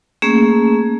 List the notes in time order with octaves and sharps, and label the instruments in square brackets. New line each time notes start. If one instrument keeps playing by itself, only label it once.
[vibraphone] A3 A#3 C#4 G#4